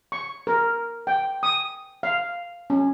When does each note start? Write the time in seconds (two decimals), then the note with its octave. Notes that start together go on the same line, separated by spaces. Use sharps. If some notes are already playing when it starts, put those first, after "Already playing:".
0.12 C#6
0.47 A#4
1.07 G5
1.43 D#6
2.03 F5
2.70 C#4